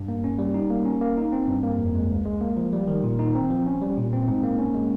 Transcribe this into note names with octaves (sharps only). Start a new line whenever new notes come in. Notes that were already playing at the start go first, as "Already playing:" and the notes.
Already playing: G2
A#3
C#4
G3
D#4
A#3
C#4
A#3
D#4
C4
G2
A#3
F2
G#3
C#2
G#3
A#3
F3
G3
D#3
A#2
D#4
C4
F3
C#4
G3
A#2
C4
G#2
A#3
C#4
G#3